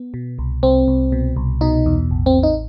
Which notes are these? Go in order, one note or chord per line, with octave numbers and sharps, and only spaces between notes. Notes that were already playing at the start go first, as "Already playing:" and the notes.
Already playing: B3
B2
C2
C2 C4
C2
B2
C2
B2 D#4
E2
A1
C4
A1
D#4